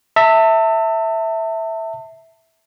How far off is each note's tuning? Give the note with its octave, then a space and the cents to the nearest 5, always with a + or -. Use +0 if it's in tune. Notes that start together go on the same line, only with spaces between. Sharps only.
E5 -10 A5 +35